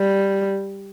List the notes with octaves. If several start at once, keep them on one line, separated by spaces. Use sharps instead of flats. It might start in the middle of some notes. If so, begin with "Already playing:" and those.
Already playing: G3